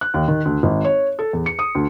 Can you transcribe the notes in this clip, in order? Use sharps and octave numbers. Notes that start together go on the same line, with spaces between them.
F#6
D#2
D#3
D2
G#1
C#5
A4
E2
C#7
D#6
D2